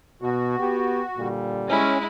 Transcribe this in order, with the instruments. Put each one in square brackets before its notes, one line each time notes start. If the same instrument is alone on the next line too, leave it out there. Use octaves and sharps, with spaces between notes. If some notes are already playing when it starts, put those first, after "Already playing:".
[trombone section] B2 [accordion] F#4
[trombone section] B3 G4
A#2 D3 G3
[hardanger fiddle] G#3 E4 [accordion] C#4